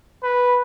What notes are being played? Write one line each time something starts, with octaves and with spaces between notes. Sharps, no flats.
B4